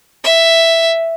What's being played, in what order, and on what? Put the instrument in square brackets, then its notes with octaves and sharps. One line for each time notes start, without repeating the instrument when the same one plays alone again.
[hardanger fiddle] E5